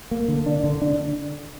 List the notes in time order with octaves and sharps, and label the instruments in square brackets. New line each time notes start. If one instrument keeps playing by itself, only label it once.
[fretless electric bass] A#3
D3
D4
D3
D4